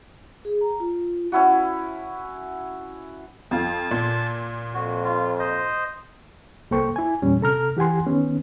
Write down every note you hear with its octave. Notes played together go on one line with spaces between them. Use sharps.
G#4
A#5
F4
C#4 E4 F#4
F2 F4 A5
A#2
F2 F#4
F4
C5 D#5
C2 A#3 A4 C5 G5 C#6
E4 G#5
E2 A#2 G3 C#4
C3 A4 A#5 F6
E3 G4 F#5 G#5 C6
D#3 B3 C#4